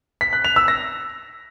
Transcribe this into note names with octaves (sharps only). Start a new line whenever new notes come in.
B6
F#6
F7
E6
A#6